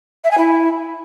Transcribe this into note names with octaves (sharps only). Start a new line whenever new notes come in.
E5
G#5
E4